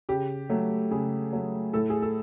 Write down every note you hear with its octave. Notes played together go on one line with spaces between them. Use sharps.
C#3 G4
F#3 A3
C#3 G#4
F#3 A3
A2 A4
G#4
A4